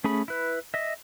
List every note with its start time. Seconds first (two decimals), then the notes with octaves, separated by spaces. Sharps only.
0.04 A3 C#4 G#4 B5
0.28 E4 B4
0.74 D#5 E5